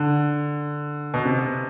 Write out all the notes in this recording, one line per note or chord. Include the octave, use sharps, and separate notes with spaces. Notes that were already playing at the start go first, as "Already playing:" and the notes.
Already playing: D3
B2
C3